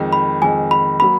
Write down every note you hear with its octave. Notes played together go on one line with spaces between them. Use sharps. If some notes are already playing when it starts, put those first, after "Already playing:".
Already playing: F2 D#3 G#3
B5
F2 D#3 G#3 G#5
B5
F#3 A#3 B5